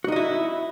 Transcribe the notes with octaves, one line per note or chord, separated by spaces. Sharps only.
D#4 E4 F#4 D#5